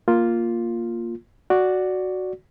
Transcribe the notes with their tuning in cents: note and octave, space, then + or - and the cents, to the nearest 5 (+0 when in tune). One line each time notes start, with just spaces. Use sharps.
A#3 +0 F4 +0
F#4 +0 D5 +0